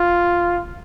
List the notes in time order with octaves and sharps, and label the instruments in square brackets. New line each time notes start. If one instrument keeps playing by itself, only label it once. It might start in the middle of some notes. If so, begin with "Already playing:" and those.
Already playing: [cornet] F4